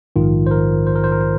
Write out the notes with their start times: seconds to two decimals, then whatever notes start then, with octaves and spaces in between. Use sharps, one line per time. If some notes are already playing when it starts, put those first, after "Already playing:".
0.16 A#1 G#2 D#3 F4
0.47 C5
0.51 A#4
0.87 C5
0.95 A#4
1.04 C5
1.12 A#4
1.21 C5